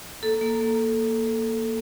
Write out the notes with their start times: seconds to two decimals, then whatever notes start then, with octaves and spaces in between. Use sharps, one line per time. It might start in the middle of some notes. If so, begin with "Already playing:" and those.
0.22 A#3 A4
0.41 A#3
0.61 A#3